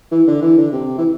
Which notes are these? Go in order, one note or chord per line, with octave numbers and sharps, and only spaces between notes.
E3
D3
E3
D3
C3
E3